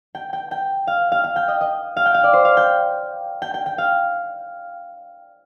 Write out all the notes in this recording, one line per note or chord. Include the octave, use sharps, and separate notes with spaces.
G5
G5
G5
F5
F5
F5
G5
D#5
D#5
F5
G5
F5
D5
C5
F5
G5
G5
G5
G5
F5